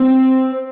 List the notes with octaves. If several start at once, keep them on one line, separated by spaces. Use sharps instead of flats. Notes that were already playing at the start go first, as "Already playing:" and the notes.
Already playing: C4